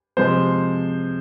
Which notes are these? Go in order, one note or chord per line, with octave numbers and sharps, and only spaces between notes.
C3 F3 G#3 C5